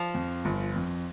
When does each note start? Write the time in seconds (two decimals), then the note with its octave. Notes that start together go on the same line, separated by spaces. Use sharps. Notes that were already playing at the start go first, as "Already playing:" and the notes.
Already playing: F3
0.14 F2
0.45 G1
0.76 F2